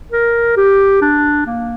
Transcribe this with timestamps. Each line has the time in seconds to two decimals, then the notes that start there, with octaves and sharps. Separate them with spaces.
0.12 A#4
0.57 G4
1.01 D4
1.46 A#3